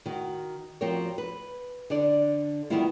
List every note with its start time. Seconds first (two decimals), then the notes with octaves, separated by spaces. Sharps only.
0.06 D#3 F#4
0.81 F3 C4 F#4 G4 A#4 C#5
1.18 B4
1.90 D3 D4 D5
2.70 D#3 E3 G3 B3 E4 F4